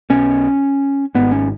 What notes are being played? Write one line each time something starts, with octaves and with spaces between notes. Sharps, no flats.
B1 B2 C#4
G#1 G#2 B3
C#4